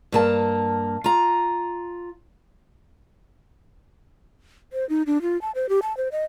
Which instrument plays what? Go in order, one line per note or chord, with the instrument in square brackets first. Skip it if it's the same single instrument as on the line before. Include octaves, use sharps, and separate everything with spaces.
[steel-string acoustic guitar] G2 A#3 A5
F4 A#5
[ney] C5
D#4
D4
F4
A5
C5
G4
A5
C5
D#5